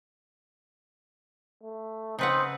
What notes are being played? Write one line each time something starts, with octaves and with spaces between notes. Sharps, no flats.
A3
C#3 C4 D#4 B4 F#5